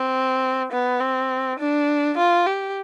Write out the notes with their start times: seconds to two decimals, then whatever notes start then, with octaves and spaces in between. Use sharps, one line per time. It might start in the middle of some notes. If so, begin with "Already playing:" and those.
Already playing: C4
0.72 B3
1.00 C4
1.59 D4
2.18 F4
2.46 G4